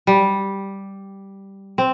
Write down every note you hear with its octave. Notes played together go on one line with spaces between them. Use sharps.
G3
C4